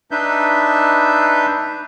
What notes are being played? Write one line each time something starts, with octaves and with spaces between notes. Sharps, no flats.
D4 D#4 B4 E5 G6